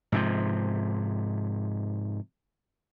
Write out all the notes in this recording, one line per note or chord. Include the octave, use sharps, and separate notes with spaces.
G#2 C3 F3